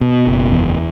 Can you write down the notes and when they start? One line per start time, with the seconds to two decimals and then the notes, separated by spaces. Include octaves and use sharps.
0.01 B2
0.27 F#1
0.52 E2